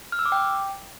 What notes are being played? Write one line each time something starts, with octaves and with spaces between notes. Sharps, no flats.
F6
E6
D6
G5